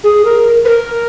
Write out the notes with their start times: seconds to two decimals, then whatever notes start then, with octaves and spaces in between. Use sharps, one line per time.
0.04 G#4
0.25 A#4
0.65 B4
0.68 A#4